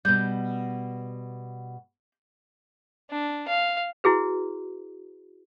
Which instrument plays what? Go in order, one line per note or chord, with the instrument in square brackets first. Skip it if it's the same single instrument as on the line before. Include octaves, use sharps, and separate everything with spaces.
[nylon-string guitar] B2 G3 [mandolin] G6
[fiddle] D4
F5
[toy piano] E4 F#4 G#4 B4